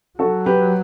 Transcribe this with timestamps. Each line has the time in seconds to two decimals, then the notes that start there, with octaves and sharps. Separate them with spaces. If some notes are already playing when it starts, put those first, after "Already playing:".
0.19 F#3 F#4 A4
0.46 G4 B4